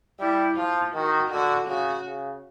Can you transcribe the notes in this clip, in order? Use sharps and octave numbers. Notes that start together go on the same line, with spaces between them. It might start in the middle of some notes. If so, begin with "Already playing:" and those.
G3 E4
F3 F4
D#3 F#4
D3 F#4
C#3 F#4
C#3